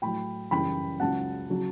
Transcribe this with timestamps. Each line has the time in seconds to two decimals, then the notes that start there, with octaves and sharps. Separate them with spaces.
0.02 A2 F#3 G5 B5
0.51 F#2 C#3 E3 G3 G5 B5
1.00 C#2 C#3 F#3 F#5 A5
1.49 C#3 F#3